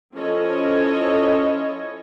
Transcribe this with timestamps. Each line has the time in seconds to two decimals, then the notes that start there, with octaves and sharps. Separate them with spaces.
0.16 F3 C#4 E4 A4 C#5 D#5